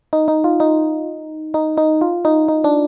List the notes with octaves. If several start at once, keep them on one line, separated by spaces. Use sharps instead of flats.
D#4
D#4
F4
D#4
D#4
D#4
F4
D#4
D#4
D4